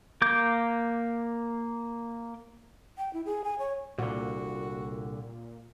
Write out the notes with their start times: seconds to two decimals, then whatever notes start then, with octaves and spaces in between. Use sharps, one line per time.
0.22 A#3 D6 G6
2.98 G5
3.13 E4
3.26 G#4
3.44 G#5
3.59 C#5
3.99 C2 A#2 D3 F#4